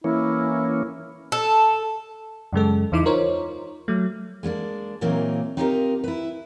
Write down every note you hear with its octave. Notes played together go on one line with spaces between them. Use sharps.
E3 A#3 C#4 E4
A4
F#2 C#3 G#3 A4
E2 E3 D#4 E4 D6
D#4 F4 A#4 C5 C#5
F#3 A3
G#3 A#3 C#4 D4
A#2 E3 F#3 A#3 C4 D#4
C4 D#4 F4 G4 A4 A#4
E4 B4